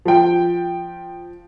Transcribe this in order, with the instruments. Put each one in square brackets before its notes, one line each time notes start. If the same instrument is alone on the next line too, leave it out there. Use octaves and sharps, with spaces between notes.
[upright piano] F3 G5